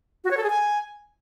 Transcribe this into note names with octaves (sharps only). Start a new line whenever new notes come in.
F#4
C#5
A4
G#4
G#5